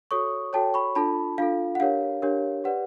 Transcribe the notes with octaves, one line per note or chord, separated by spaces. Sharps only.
F#4 A4 C#5 C#6 D#6
F#4 A4 C#5 G5 A5
B5 C#6
D4 F4 A4 A5 B5
D4 F4 A4 F5
F#5
D4 G4 A#4 C#5 F5
D4 G4 A#4 C#5
G4 B4 D5 F#5